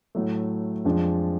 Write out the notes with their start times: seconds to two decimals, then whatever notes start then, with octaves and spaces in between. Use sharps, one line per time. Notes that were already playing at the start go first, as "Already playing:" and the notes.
0.15 A2 F#3 A3
0.85 F2 F3 G#3 D4